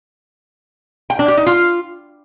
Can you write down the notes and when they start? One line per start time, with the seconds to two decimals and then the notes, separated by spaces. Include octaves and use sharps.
1.10 G5
1.19 D4
1.28 G4
1.37 D#4
1.46 F4